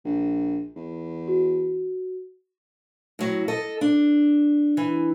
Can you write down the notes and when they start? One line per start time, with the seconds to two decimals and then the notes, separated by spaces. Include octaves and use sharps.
0.05 A#1
0.76 E2
1.28 F#4
3.19 A2 F#3
3.48 A4 D#5
3.81 D4
4.77 E3